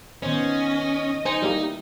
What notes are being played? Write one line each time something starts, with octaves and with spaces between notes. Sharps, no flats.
D#3 B3 C#4 C5 D#5
D#4 C5 G#5 C#7
G3 A#3 E4 G4